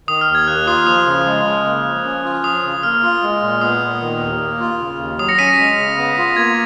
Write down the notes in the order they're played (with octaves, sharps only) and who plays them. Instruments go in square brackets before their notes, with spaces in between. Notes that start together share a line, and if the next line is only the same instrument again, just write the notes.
[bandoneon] D#3 [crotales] D#6
[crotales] F6
[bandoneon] D#2
[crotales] G#6
[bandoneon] A#3 [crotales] F#6
[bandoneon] F4 [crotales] D#6
[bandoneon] F3 [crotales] D#6
[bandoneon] C#3
G#3
C#3
A#3
F3
C#4
F4
[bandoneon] F3 [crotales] D#6
[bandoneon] C#3
[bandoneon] A#3 [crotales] F6
[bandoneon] F4
G#3
A#2
[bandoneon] B3 [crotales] D#6
[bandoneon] A#2
D#3
D#2
A#3
F4
C#3
D#2
[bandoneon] F#3 [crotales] D#6
[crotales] A#6 C#7
[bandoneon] C#4 [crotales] B6 D#7
[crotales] A#6 C#7
[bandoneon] G#3 [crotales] B6
[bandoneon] C#3
B3
F4
[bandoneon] A#3 [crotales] G#6